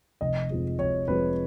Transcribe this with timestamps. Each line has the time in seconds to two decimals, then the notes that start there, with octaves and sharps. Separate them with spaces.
0.21 F1 D#5
0.50 F2 F3 G#3
0.79 F1 C#5
1.08 F2 F3 G#3 B4